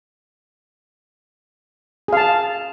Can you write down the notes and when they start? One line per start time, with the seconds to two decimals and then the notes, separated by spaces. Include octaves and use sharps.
2.08 G#4
2.13 F5
2.17 A5